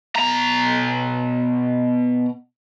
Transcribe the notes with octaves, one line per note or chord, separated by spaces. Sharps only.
B2 A#5